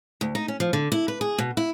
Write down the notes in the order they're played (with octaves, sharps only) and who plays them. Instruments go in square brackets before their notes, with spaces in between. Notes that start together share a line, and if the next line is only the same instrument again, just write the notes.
[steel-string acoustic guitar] D2
D#4
C#4
F3
D3
E4
B4
G#4
B2
E4